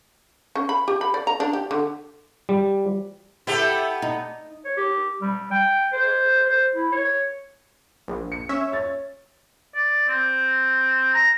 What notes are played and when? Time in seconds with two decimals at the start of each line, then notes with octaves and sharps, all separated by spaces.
0.55 C#4
0.69 B5
0.88 G4
1.01 B5
1.14 D5
1.27 A#5
1.40 D4
1.53 G4
1.71 D3
2.49 G3
3.47 B3 E4 G4 A4
4.02 D#4
4.65 C#5
4.77 G4
5.21 G3
5.50 G5
5.92 C5
6.48 C5
6.74 E4
6.92 C#5
8.08 A#1
8.32 C#7
8.49 C#4 E5
8.72 C#5 A6
9.75 D5
10.09 C4
11.14 A#5